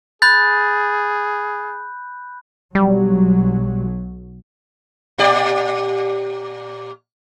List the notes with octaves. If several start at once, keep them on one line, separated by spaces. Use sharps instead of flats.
G#4 B5 F#6 G6 A6
B1 F#3 G3
A#2 G4 D5